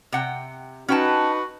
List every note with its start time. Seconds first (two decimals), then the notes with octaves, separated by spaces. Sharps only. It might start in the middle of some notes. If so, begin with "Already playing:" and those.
0.12 C3 F#5 G5
0.88 C#4 D#4 F#4 B4 G5 A5